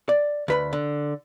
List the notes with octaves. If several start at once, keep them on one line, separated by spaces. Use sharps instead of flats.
D5
D2 B4 B5
D3